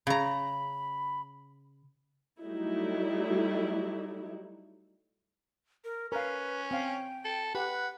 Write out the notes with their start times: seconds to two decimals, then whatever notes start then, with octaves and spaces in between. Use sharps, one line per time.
0.07 C#3 A#5 B5
2.42 F#3 G3 A3 D#4 E4
5.84 A#4
6.12 C#4 A#4 B4 F5
6.71 C4 F5 G5
7.25 A4
7.55 G4 B4 F#5